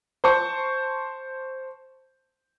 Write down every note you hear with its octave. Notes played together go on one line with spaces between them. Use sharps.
C5 A5 C#6